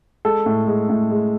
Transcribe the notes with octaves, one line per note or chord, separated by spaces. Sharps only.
G#3 A4
A2
G#3
A2
G#3